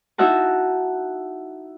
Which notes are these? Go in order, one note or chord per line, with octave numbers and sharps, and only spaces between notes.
D#4 E4 F#4 E5 F#5 A5